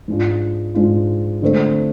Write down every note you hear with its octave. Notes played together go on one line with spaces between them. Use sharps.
G#2 G#3 D4 F4
G#2 G#3 D4 F4
D3 A3 C4